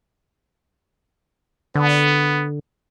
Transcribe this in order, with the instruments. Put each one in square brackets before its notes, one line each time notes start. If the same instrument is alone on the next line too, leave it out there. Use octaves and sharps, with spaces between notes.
[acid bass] D3 [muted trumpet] B3